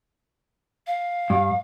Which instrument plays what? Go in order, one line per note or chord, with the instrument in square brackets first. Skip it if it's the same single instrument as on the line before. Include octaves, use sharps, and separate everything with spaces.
[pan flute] F5
[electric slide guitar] G2